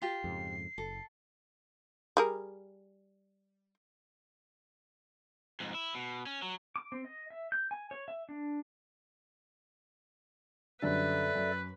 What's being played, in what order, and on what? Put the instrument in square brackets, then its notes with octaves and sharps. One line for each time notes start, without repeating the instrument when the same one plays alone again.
[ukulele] F4 G4 [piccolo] C7
[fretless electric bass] F2 G#2 C#3
[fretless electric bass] F#1 [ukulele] A4
[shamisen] G3 G#4 A#4
[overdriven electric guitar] F2 G#2
E4
B2
C#4
F#3
[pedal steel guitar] D6
C4
D#5
E5
G6
G#5
C#5
E5
D4
[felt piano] F#2 D3 G3 [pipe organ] A4 D5 E5 [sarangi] B4
[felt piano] F#2